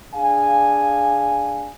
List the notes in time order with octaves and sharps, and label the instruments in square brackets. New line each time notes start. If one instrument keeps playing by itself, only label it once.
[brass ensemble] D4 G#4 F5 G#5